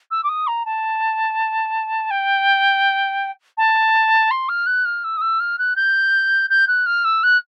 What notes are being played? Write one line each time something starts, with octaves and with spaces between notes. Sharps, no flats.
E6
D6
D#6
A#5
A5
G5
A5
C6
F6
F#6
F6
E6
D#6
E6
F6
F#6
G6
G6
F#6
F6
E6
F#6